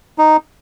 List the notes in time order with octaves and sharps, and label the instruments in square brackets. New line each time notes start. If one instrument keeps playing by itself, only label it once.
[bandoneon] D#4